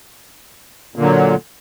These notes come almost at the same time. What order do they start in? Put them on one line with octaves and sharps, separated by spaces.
A#2 D3 F#3